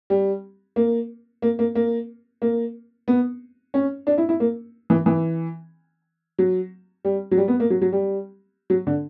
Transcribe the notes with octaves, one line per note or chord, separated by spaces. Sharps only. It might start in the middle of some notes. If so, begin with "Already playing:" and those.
G3
A#3
A#3
A#3
A#3
A#3
B3
C#4
D4
E4
E4
A#3
E3
E3
F#3
G3
F#3
G3
B3
A#3
F#3
F#3
G3
F#3
D3